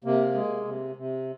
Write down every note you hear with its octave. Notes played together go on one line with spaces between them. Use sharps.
C3 A#3
G#3
C3
C3